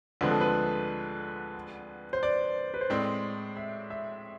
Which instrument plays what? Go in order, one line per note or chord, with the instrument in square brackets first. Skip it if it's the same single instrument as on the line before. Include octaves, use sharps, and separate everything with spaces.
[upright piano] D2 D3 F3 G#3 C4 [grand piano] B4
[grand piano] A4
B4
C5
D5
B4
C5
[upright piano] A2 G#3 C4 [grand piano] D5
[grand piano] E5
E5